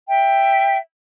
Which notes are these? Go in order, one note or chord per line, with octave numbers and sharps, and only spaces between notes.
E5 G5